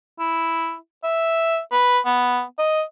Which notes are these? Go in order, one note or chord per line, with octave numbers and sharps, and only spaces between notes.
E4
E5
B4
B3
D#5